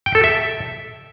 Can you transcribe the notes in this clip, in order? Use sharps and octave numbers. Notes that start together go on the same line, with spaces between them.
G5
A4
E5